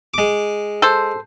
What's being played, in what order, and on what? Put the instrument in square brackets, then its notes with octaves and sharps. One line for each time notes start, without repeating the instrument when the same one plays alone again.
[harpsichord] G#3 D6
[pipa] A4 C5